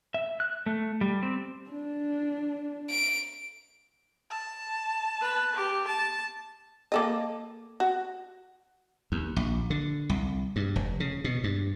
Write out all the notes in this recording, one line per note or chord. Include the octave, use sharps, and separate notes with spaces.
E5
F#6
A3
G3
C4
D4
D7
A5
B4
G4
A5
A#3 A4 D#5
F#4
D#2
A#1
D3
C2
G2
F1
C#3
B2
G2